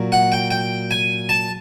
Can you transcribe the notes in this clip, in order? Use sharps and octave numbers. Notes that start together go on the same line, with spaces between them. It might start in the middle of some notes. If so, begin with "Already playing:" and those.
Already playing: A#2 F#3
F#5
G5
G5
G#5
A5